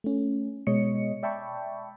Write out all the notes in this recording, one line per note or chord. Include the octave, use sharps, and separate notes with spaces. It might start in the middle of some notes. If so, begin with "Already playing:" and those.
A3 C#4
B2 G#3 C#5 D#5 C#7
D5 E5 G5 A5 B5 C#6